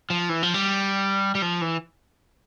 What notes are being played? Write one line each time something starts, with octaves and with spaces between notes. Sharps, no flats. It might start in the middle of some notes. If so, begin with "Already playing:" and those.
F3
E3
F3
G3
G3
F3
E3